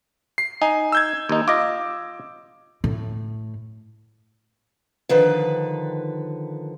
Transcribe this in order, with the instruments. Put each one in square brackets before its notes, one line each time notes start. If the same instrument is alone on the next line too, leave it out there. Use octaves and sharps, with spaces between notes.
[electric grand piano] C7
[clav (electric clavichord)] D#4 [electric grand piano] G#5
[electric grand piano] E6 G6 G#6
[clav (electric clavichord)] D#2 D#4
[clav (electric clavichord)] F4 D#5 [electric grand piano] D6
[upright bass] A2
[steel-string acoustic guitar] D3 D#3 F3 B4